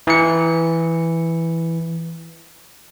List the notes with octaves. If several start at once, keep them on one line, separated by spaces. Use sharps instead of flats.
E3 C#7